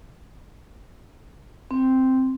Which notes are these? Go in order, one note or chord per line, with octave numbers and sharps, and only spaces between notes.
C4